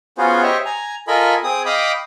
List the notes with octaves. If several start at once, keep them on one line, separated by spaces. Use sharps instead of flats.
B3 C#4 F4 F#4 G#4 C5
G4 C5 C#5 D#5 E5
G#5 A#5
F4 A4 A#4 D#5 G#5 B5
C4 G#4 D#6
D#5 F5 G5 B5 D6 D#6